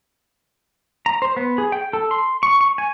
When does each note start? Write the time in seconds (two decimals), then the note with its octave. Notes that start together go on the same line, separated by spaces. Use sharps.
1.06 A#5
1.22 C5
1.37 B3
1.58 G#4
1.72 G5
1.93 A4
2.11 C6
2.43 C#6
2.61 C#6
2.78 G#5